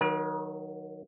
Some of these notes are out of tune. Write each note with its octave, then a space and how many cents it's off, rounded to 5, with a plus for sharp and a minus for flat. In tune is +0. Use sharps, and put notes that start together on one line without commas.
D#3 -10 F#3 -5 A#4 +45